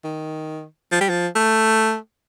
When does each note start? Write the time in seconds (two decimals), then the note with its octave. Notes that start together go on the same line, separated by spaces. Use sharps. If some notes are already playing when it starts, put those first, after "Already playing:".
0.04 D#3
0.92 F3
1.01 G3
1.09 F3
1.35 A3